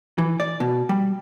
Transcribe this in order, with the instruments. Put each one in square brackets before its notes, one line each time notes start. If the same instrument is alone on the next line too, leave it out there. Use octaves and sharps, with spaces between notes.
[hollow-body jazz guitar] E3
D5
B2
G3